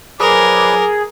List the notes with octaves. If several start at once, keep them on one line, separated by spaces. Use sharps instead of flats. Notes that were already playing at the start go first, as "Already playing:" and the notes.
F3 F#3 G#4 A#4 B4 D5 D6